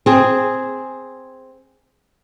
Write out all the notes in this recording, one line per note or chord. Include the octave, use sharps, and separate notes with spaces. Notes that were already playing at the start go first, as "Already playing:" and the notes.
C4 G#4